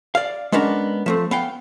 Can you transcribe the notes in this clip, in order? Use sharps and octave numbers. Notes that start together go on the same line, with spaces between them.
D5 F5
G#3 B3 C#4 D4 A#4
F3 A3 C4
B3 F5 G5